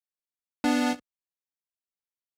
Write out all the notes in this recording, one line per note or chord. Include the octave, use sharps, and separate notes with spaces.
B3 D4